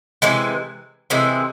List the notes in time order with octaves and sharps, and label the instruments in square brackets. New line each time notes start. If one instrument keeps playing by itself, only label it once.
[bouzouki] C3 E3 G#3
C3 E3 G#3